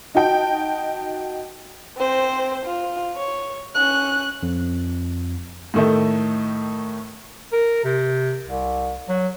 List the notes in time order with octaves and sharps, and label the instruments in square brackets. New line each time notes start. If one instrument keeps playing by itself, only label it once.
[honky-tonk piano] D#4 F#4 D#5 G5 A5
[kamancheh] C4 C5
F4
C#5
C#4 F#6
[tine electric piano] F2
[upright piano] A2 D#3 A3
[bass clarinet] A#4
C3
C2
F#3